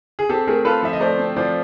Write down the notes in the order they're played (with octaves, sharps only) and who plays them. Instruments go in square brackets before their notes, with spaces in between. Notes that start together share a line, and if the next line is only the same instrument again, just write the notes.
[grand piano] G#4
[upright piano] C4 [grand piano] G4 A4
[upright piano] A3 [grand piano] G#4 A#4
[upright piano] F4 [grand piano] A4 B4
[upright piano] F3 [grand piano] E5
[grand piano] D#5
[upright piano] A3 [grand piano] C5 D5
[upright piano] C4
[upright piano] F3 [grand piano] C5 D5